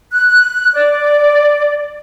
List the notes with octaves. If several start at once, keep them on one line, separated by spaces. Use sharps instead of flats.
F#6
D5